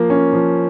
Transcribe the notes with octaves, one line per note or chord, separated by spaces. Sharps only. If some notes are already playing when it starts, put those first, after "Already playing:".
Already playing: F3 A#3
C#4
F3